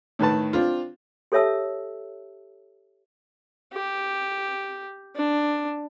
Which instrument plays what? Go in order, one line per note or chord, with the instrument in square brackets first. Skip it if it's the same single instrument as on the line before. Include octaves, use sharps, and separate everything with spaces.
[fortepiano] A2 D#3 B4 A5
C4 D4 F4
[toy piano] G4 A4 C#5 E5 A5 E6
[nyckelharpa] G4
D4